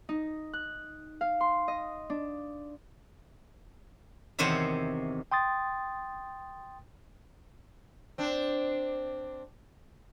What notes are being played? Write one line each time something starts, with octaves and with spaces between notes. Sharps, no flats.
D#4
F#6
F5
C6
D#5
D4
E2 C3 D#3 C5 C#5 E5
G5 C6 D#6 A6
C4 D4